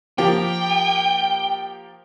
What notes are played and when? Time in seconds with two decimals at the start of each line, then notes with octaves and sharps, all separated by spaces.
0.18 F3 A#3 G4 G5